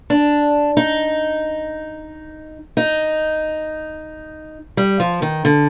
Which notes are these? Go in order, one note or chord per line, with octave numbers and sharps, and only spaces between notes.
D4
D#4
D#4
G3
F3
D#3
D3